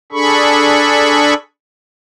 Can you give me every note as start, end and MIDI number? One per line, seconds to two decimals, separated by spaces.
0.12 1.34 62
0.12 1.34 68
0.12 1.34 69
0.12 1.34 83
0.12 1.34 85